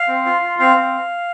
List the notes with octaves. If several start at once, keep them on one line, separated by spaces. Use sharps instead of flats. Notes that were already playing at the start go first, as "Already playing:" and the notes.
Already playing: F5
C4
F4
F4
C4 F5
C4